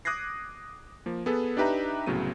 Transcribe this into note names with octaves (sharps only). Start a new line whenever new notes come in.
D6 D#6 F#6 G#6 A#6 C7
F3 A#3
B3 G#4 A4 B4
D4 D#4 G4 B4 E5 A#5
C2 A2 C#3 F#3 B3 D#7